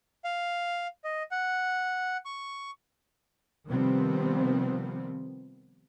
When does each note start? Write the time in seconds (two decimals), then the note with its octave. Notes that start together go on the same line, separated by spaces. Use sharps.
0.24 F5
1.04 D#5
1.31 F#5
2.25 C#6
3.69 C3 D#3 F3 G3 B3 C4